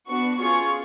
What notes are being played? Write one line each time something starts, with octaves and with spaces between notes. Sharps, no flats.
B3 D4 F#4 C#6
C#4 F4 G#4 C#6